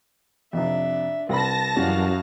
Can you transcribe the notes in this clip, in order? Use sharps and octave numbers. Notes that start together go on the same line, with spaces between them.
F2 C3 D4 E5
C2 B4 A5 B5 A#6
F#2 E3 G3 C#4 F#4 F5